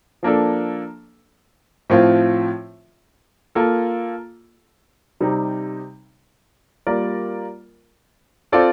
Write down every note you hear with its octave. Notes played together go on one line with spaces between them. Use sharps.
F3 A#3 D4 A4
A2 F3 C4 F4
A#3 F4 A4
C3 G3 C4 D#4
G3 A#3 F4 A#4 D5
C4 F4 A4 D5